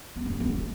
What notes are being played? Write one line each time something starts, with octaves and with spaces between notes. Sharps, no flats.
B3
A#3
B3
G#3
A#3